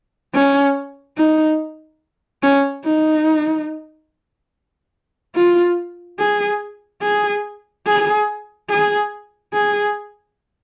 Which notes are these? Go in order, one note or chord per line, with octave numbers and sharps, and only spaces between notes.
C#4
D#4
C#4
D#4
F4
G#4
G#4
G#4
G#4
G#4